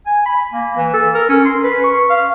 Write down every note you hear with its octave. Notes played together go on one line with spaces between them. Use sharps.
G#5
B5
A#3
E3
A4
A#4
C#4
C6
B4
C#6
F5